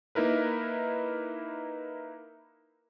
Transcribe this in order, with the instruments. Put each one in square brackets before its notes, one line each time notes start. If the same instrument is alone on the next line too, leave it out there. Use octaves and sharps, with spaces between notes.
[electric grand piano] A#3 D#4 E4 A#4 B4